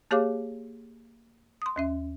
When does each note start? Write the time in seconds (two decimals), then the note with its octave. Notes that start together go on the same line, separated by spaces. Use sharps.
0.11 A#3 G4 G#4 C#5 F5 D6
1.62 C6 D#6
1.76 D#2 C#4 E5